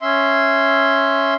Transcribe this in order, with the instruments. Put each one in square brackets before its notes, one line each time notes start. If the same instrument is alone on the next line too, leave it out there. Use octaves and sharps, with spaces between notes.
[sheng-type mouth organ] C#4 E5 C6